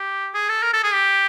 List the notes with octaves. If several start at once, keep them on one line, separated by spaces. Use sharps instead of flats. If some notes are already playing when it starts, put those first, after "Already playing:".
Already playing: G4
G#4
A4
A#4
A4
G#4
G4